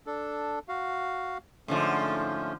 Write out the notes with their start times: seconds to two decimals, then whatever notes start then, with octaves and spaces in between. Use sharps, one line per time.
0.07 D4 A4
0.68 F#4 F5
1.68 G#2 D3 F3 A3 C#4